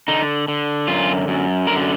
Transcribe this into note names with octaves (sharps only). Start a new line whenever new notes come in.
D3 D#4
D3
F#2 F4
F#2
D3 A#4